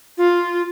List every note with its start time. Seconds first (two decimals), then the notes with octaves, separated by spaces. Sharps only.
0.18 F4